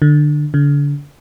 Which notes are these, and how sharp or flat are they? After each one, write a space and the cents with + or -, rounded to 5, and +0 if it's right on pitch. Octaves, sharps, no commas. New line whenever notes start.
D3 +20
D3 -35